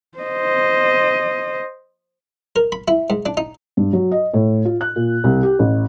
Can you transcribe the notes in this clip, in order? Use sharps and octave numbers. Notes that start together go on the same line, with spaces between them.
C5 D#5
A#4
B5
E4
G#2
D4
D#4
G2
F#3
D#5
A2
F4
F#6
A#2
C2
G4
A1